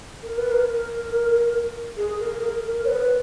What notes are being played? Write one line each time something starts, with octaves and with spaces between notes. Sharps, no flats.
A#4
B4
A#4
G#4
A#4
A#4
A#4
C#5
B4